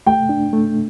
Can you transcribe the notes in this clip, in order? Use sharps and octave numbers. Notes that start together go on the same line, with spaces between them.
A3 G5
D4
A3